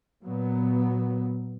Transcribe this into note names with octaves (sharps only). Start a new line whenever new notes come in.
A#2 F#3 B3